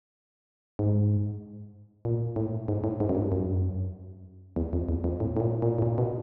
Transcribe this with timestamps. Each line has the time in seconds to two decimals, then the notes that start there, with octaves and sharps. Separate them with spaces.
0.79 G#2
2.05 A#2
2.36 A2
2.68 G#2
2.84 A2
3.00 G#2
3.09 F#2
3.15 G2
3.32 F#2
4.56 E2
4.73 F2
4.89 E2
5.04 F2
5.20 A2
5.37 A2
5.40 A#2
5.62 A#2
5.78 A2
5.82 A#2
5.98 B2